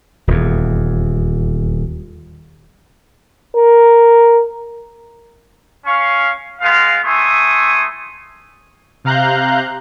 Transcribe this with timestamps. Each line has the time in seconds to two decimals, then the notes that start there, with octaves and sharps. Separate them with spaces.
0.27 D#1 E2
3.56 A#4
5.85 C#4 F5 C#6
6.60 G#3 B3 F4 F5
7.03 A3 E4 G#5 C6 C#6 D#6
9.04 C3 F5 A#5 F#6 G6